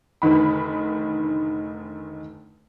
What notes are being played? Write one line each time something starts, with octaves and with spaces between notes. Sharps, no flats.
F1 D3 D#3 B5